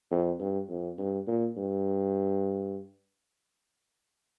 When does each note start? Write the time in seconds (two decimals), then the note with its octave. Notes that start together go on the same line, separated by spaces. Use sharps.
0.11 F2
0.40 G2
0.69 F2
0.98 G2
1.27 A#2
1.57 G2